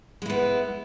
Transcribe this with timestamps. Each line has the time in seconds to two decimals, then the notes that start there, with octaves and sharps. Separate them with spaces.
0.22 G#3
0.26 E4
0.30 B3